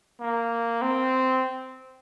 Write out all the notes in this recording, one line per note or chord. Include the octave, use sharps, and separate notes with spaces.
A#3
C4